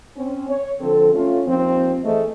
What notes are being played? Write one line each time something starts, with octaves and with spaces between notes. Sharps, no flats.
C4 C#4
C#5
D3 F3 C4 A4
A3 C#4 F4
D#2 F3 C4
E3 A3 G#4 C5 D#5